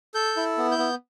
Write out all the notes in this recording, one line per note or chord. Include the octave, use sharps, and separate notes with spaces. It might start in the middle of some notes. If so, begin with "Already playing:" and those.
A4 G6
E4
B3
G6
B3